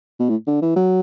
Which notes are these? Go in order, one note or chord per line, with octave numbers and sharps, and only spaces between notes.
B2
A2
D3
E3
F#3